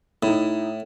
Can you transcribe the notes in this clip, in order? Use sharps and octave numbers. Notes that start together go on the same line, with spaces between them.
A2 D#4 E4